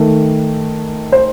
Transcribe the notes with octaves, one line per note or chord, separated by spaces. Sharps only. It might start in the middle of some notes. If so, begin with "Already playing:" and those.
Already playing: D#3 A3
C5